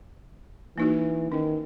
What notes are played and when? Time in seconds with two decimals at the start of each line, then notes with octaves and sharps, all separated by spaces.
0.78 E3 A#3 D#4 F#4
1.32 D#3 C#4